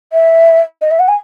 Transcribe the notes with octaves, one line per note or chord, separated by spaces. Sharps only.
E5
D#5
E5
F#5
G#5